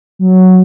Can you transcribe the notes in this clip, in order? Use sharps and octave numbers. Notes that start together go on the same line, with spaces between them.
F#3